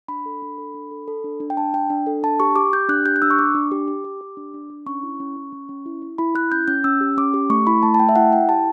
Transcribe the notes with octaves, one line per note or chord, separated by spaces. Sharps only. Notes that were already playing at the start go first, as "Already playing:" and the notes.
D4 B5
A4
D4
A4
D4
A4
A4
D4
D4
G5
D4 A5
D4 G5
D4
A4
D4 A5
G4 C#6
G4 D6
G4 G6
D4 F#6
G4 G6
F#6
D4 E6
C#6
D4 D6
D4
G4
G4
G4
G4
D4
D4
D4
C#4 C#6
E4
C#4
C#4
C#4
C#4
E4
E4
E4 B5
E4 F#6
C#4 G6
C#4 G6
C#4 E6
G4
C#4 D6
G4
A3 C#6
E4 B5
A3 A5
A5
A3 G5
E5
E4 F#5
E4 G5
G4 A5